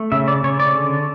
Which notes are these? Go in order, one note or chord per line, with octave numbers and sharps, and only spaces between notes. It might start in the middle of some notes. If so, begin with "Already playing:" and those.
Already playing: A3
C#3 E5
D5
C#3 C#5
D5
D3